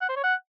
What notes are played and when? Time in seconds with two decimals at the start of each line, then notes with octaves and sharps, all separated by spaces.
0.01 F#5
0.09 C5
0.16 C#5
0.24 F#5